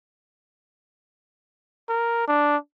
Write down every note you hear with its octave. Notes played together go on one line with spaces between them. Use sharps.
A#4
D4